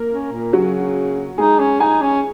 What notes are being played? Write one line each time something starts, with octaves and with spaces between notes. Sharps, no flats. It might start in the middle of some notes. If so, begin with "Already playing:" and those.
Already playing: A#3 A#4
C#4
A#2
C#3 F#3 F#4
G#3 D#4 G#4
C#4
D#4 G#4 G#5
C#4